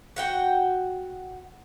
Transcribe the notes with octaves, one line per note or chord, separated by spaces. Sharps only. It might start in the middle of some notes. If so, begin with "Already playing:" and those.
F#4 F#5 G5